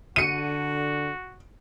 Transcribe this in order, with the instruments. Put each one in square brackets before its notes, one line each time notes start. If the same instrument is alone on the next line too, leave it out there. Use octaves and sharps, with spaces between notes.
[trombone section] D3 [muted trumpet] F#4 [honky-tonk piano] C#7 D#7